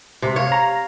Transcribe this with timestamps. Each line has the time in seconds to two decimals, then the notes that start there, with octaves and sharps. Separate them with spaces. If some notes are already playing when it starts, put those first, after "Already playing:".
0.22 C3
0.36 C#5 F5
0.52 A#5